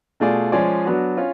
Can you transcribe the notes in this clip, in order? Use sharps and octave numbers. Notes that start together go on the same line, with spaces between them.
B2 A3 F4 G#4 D5
F3 G#3 C#4 G#4 D5
F#3 B3 D4 F#4
C#4 F4